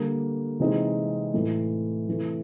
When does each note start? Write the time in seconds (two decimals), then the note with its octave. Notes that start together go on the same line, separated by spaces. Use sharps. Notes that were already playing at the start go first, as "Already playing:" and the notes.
Already playing: D3 G3 A#3
0.60 C3 E3 G#3 C4 D#4
1.34 A2 E3 A3
2.08 C3 E3 A3